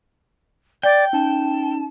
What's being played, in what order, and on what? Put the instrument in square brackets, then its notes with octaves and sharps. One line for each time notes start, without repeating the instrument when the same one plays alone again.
[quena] D5 [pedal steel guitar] G5
[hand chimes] C#4 D#4 [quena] A5